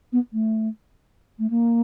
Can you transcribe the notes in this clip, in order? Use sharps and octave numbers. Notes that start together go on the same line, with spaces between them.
B3
A3
A3
A#3